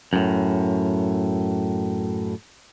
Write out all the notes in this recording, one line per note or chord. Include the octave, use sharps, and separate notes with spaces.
F#2 A2